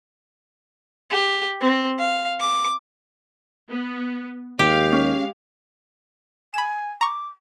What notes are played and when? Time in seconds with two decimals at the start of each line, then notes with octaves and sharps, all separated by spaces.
1.11 G4
1.61 C4
1.99 F5
2.40 D6
3.69 B3
4.59 D#2 G#3 G4 F5
4.92 C#4
6.54 G#5 B5 E7
7.01 A#5 C#6 D6